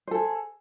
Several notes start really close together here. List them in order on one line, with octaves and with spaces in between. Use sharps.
C5 A4 G#4